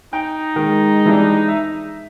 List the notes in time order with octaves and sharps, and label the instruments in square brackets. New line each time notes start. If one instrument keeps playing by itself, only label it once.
[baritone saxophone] D#4 [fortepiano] G5
[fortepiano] D#3 [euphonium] G#3
[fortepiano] E3 G3 D4
E5